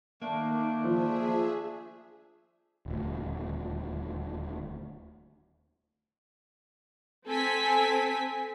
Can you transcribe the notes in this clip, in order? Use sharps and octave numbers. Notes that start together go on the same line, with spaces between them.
D#3 A3 A#3 D4
F3 G#4 E5
D#1 D2
C4 A4 G#5 B6